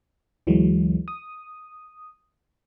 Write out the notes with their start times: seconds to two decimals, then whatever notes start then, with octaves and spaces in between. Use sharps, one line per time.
0.47 D2 E3 F#3 G#3
1.08 D#6